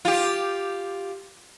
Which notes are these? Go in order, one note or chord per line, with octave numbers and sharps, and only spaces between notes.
F4 G4